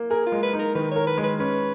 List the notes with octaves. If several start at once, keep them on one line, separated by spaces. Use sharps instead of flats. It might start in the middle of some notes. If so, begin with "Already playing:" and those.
Already playing: A#3
G#4 A#4
F4
G#3
B4
D#4
A#4
D#3 B4
A#4 C#5
B4
G#3
B4
C#4 B4